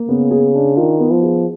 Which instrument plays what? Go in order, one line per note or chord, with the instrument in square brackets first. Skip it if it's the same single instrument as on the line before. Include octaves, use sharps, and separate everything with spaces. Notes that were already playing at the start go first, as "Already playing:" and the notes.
Already playing: [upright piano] A#3
[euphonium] C#3 [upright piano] B3
[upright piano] G#4
D4
[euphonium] D#3 [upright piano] F4
[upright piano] B3
[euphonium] F3
[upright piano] G#4